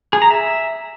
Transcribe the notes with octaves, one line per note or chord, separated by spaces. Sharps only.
G#4
A#5
E5